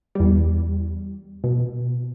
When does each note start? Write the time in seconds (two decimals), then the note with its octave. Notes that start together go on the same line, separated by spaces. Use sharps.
0.15 E2 G3
1.44 B2